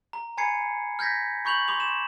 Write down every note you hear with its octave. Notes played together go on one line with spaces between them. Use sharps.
A#5
G#5 A#5 B5 G#6 C7 C#7
F6 G6 G#6 A#6 B6
B5 C#6 G6 F7 F#7
C6 D6 F7
E7